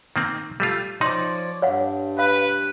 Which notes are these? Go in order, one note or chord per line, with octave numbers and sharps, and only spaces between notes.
D#3 A#3 C4
G3 A3 F4
F3 D#4 C#5 D5 C6
G2 C#5 F5 F#5
B4 F5